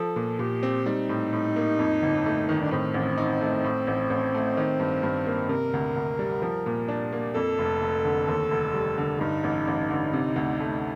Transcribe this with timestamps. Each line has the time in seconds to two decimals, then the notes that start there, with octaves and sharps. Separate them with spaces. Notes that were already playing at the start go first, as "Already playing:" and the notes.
Already playing: F3 A4
0.16 A#2
0.39 A#2 G4
0.63 C4
0.86 G3 D#4
1.09 A2
1.33 A2
1.56 A#3
1.79 F2
2.02 G1
2.26 A3
2.49 D#3
2.61 D4
2.71 A2 C4
2.94 A1
3.18 D#4
3.41 A3
3.64 A2
3.87 A1
4.10 A1
4.34 A3
4.57 D#3
4.80 G2
5.03 G2
5.26 A#3
5.49 C3 A#4
5.73 D2
5.96 D2
6.19 G3
6.42 F3
6.66 A#2
6.88 D4
7.12 A#3
7.35 F2 A4
7.59 F1
7.81 F1
8.05 D3
8.28 D#2
8.51 F1
8.74 G3
8.98 D3
9.20 G2 D#4
9.44 A1
9.68 A1
9.90 D3
10.13 C3
10.36 D2
10.60 A3